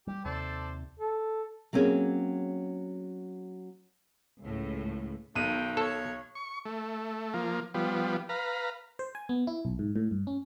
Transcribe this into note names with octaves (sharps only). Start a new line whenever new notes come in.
G3 G4
D#2 C3 A4 C5 D5
A4
F#3 A#3 C4 C#4 G#4
C#2 A2
B1 D#3 G5 D#7
A4 C#5
C#6
A3
F3 A#3
F3 G3 B3
B4 F5 A#5
C5
G#5
B3
E4
B1
G#2
A2
G2
C#4